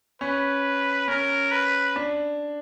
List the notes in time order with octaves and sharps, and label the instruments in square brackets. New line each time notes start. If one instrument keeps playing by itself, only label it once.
[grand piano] C#4 [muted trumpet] B4
[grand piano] C#4 [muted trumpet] A#4
[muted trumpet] B4
[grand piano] D4